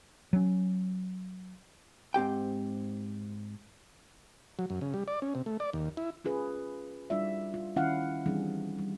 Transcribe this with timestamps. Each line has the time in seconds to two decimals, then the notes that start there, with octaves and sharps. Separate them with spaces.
0.33 F#3 C#4
2.14 G#2 C4 G4 G5
4.59 F#3
4.70 F#2
4.81 C#3
4.94 G3
5.08 D5
5.22 C#4
5.35 C3
5.46 A3
5.60 D5
5.73 D#2
5.97 E4
6.24 C#4 F4 G#4 B4
7.10 G3 D4 E4 F4 D5 E5
7.54 F4
7.76 D#3 C#4 E4 F4 F5 F#5
8.26 E3 G3 C4 D4 G#4
8.79 G3